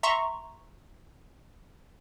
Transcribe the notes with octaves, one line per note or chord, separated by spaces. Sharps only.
E5 A#5 C6 C#6